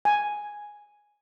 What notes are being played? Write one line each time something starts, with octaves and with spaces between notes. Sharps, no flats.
G#5